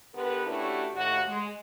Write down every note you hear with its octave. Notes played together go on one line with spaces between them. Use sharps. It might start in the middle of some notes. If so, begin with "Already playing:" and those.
D3 B3 G4 A#4 B4
A3 C#4 D4 E4 F#4 G4
D#2 A2 F#4
G#3